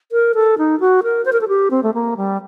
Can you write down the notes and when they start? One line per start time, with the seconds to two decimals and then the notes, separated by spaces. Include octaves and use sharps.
0.12 A#4
0.35 A4
0.58 D#4
0.80 F#4
1.03 A#4
1.25 C5
1.33 A#4
1.41 A4
1.48 G4
1.71 C4
1.83 A3
1.94 A#3
2.17 G3